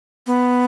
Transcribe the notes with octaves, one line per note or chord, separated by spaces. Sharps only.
B3